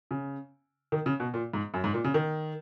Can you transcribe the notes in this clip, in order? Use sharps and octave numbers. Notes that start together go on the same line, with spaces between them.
C#3
D#3
C#3
B2
A#2
G#2
F#2
G#2
A#2
C#3
D#3